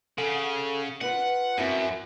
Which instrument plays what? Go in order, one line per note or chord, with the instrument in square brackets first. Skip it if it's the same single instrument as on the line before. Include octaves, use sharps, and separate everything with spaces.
[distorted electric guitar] C#3 [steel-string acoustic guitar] A4 F#5
[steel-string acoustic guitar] F4 B4 D5 [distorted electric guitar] F#5
[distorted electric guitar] F#2 [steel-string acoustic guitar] C4 E4 F#4